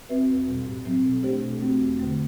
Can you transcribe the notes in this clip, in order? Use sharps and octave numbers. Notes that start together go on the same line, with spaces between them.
C4 F#4 B4 E5
E2
B2 G3
A2
F#3 C4
B2
A3 D4 G4 C5
B2
A3 C4 F#4
E2
D3 A3